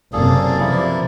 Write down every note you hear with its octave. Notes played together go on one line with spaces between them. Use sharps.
F#1 C3 A#3 G#4 A4 D5
C3 E3 F3 A#3 E4